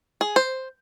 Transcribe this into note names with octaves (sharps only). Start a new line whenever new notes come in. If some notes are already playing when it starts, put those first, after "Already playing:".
G#4
C5